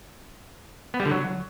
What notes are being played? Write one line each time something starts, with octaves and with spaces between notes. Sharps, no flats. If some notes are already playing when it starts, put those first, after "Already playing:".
B3
G3
D3
F#3